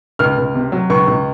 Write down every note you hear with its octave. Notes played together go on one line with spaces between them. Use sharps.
C#2 F6
C#2
C3
F#3
C#2 C#6
C#2